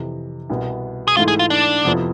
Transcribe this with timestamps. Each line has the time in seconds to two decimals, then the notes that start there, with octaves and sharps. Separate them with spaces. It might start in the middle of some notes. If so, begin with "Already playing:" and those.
Already playing: F2 C3 E3
0.50 C2 B2 B3
1.08 G#4
1.17 G#2 E3 A3 E4 F4
1.28 G#4
1.39 F4
1.50 D4
1.85 F2 C3 F3 B3 E4